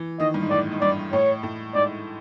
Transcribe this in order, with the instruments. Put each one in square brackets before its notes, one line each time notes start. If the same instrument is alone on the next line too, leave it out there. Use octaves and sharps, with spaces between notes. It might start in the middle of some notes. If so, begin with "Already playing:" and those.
Already playing: [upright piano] E3
[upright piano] D#3 [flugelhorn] D#5
[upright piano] G2
G#2
[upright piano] A2 [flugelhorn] D5
[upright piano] G#2
[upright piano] G2 [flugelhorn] D5
[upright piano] A2 [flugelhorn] C#5
[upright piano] A2
[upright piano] G#2 [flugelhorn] D5